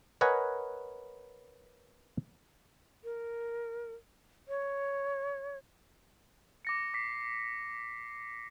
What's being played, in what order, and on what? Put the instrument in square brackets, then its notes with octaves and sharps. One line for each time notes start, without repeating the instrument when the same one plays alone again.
[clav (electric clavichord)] A#4 B4 C#5 D#5 F#5 G#5
[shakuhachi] A#4
C#5
[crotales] D6 A#6 C#7
D6 B6 C7